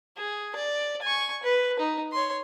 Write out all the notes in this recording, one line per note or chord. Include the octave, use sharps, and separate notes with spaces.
G#4
D5
G#5 C#6
B4
D#4
C#5 C6